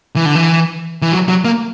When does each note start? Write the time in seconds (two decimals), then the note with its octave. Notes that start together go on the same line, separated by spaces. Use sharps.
0.16 E3
0.26 D3
0.36 E3
1.02 E3
1.12 F#3
1.28 F#3
1.45 A#3